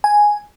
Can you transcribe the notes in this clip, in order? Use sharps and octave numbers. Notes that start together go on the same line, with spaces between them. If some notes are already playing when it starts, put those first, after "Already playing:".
G#5